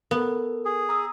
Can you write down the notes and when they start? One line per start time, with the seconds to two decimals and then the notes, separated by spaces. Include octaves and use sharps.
0.11 B3 A4 A#4
0.65 G#4
0.89 A#5 D#6 E6